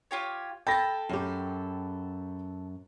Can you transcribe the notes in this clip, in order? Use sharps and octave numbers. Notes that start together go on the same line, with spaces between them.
F4 G4 C#5
A4 G5 A5 B5 A#6
F#2 G4